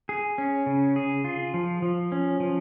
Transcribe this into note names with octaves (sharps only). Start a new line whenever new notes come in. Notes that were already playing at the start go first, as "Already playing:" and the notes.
G#4
C#4
C#3
G#4
F4
F3
F3
C#4
F3